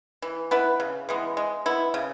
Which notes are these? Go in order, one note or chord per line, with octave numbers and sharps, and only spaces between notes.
E3
B3 E4 B4
C#3
E3 G#3 B3
G#3
B3 E4
C#3